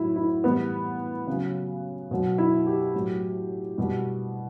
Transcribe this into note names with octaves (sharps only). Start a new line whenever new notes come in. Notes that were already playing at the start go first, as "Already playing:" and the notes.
Already playing: A2 F#3 E4
E4
A2 E3 G3 B3
C#3 F#3
B2 F#3
E4
G4
A2 F#3
B2 G3